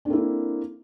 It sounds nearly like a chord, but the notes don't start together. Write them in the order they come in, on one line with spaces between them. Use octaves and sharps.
D4 C4 A#3 E4 A4